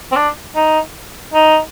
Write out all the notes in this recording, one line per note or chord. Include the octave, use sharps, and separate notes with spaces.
C4
D4
D#4
D#4